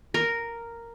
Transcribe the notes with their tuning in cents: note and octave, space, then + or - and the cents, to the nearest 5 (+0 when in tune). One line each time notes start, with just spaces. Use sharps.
A#4 -5